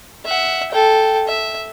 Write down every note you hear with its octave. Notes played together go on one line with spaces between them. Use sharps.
E5 F#5
A4 G5
E5